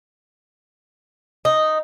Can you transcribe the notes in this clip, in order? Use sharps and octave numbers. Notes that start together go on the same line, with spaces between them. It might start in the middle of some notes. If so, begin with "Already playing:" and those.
D#4